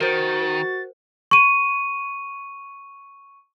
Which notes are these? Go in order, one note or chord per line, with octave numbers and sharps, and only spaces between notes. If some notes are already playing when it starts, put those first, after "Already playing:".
D#3 F#4 A#4 C5 A6
C#6 D#7